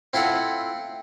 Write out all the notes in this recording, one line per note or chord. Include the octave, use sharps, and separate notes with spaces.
C4 E4 F4 A4 F#5